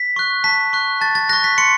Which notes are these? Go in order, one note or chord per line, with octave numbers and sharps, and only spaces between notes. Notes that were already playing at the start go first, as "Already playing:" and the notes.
Already playing: B6
C#6 F#6
A5 B6
C#6 F#6
A5 A6
A6
C#6 F#6 A#6
B6
C6 C#7